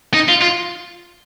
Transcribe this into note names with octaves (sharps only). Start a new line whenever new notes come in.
D#4
F4
F4